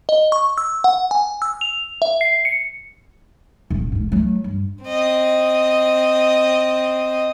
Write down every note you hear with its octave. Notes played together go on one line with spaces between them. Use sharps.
D#5
C#6
E6
F#5
G#5
E6
F7
E5
C7
C#7
D#1
F1 G#2
F#3 A3
G2
C4 D#5